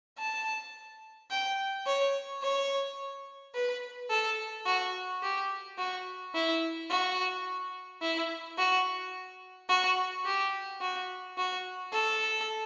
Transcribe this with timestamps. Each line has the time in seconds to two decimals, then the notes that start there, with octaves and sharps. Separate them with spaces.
0.19 A5
1.31 G5
1.87 C#5
2.43 C#5
3.55 B4
4.10 A4
4.66 F#4
5.23 G4
5.78 F#4
6.35 E4
6.90 F#4
8.02 E4
8.58 F#4
9.69 F#4
10.25 G4
10.81 F#4
11.38 F#4
11.93 A4